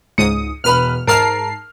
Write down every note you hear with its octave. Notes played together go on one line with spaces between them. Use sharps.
C#2 G#2 D#6 C#7
E1 B4 B5 F6
G#2 A#4 A5 F6 C7 F7